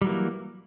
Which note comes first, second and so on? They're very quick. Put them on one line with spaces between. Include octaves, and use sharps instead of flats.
G3 F#3 E3 A#3